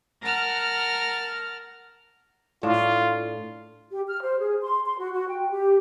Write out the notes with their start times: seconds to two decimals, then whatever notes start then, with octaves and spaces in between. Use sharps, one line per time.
0.21 A#4 F#5 A5 F6
2.63 A2 D4 F4
3.90 G4
4.08 F6
4.21 C5
4.40 G#4
4.63 C6
4.86 C6
4.99 F#4
5.12 F#4
5.29 G5
5.50 G4